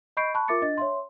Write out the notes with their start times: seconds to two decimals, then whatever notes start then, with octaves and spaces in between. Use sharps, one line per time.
0.17 D#5 B5 C#6 G6 C7 D7
0.34 A5 B5 C#6 F#6
0.48 F4 A#4 E5 D6 A6 C#7
0.62 D4 D#5 A6
0.78 C#5 E5 C6